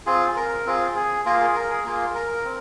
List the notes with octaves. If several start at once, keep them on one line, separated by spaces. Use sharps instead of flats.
C4 F4 G#4
A#4
C4 F4 G#4
G#4
A#3 F4 G#4 A#4
G#4
A#4
G#4
A#3 F4 G#4 A#4
A#4
C4